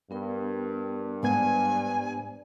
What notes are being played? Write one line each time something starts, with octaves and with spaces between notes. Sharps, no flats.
G2 B3 A#4 G5
G#2 B3 C5 D5 G#5 G#6